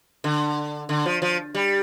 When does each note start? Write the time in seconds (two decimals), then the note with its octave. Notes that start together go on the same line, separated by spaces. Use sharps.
0.24 D3
0.89 D3
1.06 F3
1.22 F3
1.55 G3